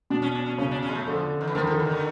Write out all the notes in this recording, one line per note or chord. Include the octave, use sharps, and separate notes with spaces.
B2 D4
C#4
D4
C#4
C#3 C#4
D4
C#4
G#3
A3
D3 F3
D#3
E3
D#3 F3
F3
D3
E3
D#3
D3